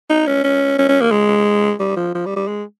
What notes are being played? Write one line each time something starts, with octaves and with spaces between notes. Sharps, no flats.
D#4
C#4
C#4
C#4
C#4
A#3
G#3
G3
F3
F3
G3
G3
G#3